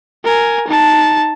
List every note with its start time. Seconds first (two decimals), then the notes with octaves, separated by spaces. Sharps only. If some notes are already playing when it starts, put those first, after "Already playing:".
0.24 A#4 G#5
0.68 D#4 A5